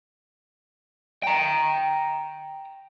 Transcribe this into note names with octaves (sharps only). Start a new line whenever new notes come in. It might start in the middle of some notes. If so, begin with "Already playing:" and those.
G5 A#5